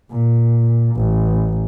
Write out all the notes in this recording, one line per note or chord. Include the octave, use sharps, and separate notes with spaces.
A#2
A1